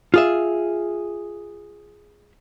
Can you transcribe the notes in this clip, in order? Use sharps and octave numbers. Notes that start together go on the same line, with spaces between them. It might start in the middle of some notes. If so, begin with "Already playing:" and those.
F4 G#4 E5